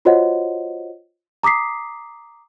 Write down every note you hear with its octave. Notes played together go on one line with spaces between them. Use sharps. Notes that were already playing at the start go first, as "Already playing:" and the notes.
F4 F#4 C5 C#5 D#5 F#5
A#5 D6 D#6 B6 C7